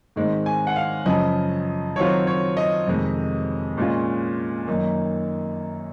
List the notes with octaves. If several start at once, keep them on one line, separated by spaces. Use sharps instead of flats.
G#2 D#3 G#3 C4
G#5
F#5
F5
F#2 C#3 F3 D#5
D#3 F#3 C4 F4 C#5
C#5
D#5
F2 C3 D#3 G#3
A#2 G#3 C#4 F4
F#2 D#3 A#3 D#4